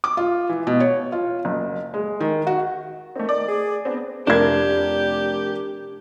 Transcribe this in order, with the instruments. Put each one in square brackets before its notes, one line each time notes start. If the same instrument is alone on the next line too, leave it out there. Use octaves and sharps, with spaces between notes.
[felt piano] D6
F4
E3
B2
C#5
F4
F#1
G#3
D#3
F#4
[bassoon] D#3 [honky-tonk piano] A3 C4
[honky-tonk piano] D5
[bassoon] G#4
[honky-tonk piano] B3 C4 [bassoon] D4
[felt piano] F1 A#4 G#6 [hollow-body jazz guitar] D4 [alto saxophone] G4